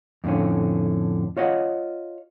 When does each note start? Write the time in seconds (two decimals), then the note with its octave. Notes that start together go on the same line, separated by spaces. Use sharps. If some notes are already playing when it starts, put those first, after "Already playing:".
0.24 F2 A2 D3 C#4
1.37 F4 C#5 D#5 F#5